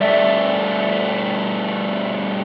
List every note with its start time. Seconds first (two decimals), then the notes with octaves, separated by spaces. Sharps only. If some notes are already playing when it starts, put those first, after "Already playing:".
0.01 G2 A3 D5 E5